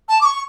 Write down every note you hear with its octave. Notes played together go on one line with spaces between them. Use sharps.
A5
D6
C#6